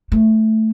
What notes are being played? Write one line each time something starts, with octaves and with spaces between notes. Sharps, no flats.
A3